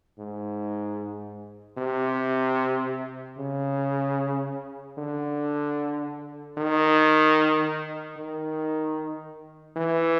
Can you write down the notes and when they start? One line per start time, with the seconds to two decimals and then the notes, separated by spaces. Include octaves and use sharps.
0.18 G#2
1.77 C3
3.38 C#3
4.98 D3
6.58 D#3
8.17 D#3
9.76 E3